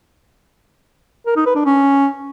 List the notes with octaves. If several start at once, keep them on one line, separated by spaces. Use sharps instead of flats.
A#4
D#4
B4
D4
C#4